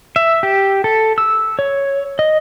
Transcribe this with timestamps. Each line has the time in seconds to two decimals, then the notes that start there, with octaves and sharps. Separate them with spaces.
0.16 E5
0.43 G4
0.84 A4
1.18 E6
1.59 C#5
2.19 D#5